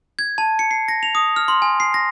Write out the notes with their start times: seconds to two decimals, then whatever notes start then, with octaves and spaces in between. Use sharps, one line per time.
0.19 G#6
0.38 A5
0.59 C#7
0.71 C7
0.88 A#6
1.03 F7
1.15 D#6
1.36 F6
1.48 C6
1.62 G#5
1.80 C7
1.94 A#6